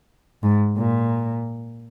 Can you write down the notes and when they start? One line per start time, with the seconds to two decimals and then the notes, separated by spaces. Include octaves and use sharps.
0.43 G#2
0.78 A#2